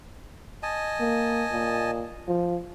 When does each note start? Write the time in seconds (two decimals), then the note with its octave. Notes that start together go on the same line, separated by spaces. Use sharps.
0.63 D#5 G#5 A5
1.00 A#3
1.52 A#2
2.28 F3